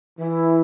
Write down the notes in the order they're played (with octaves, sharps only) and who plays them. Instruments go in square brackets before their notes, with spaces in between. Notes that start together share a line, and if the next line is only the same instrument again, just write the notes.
[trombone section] E3 [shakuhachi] E4